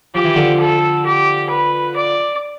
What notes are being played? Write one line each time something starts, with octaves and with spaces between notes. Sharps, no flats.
F3 G4
E3
D3 F3
A4
G4
B4
D5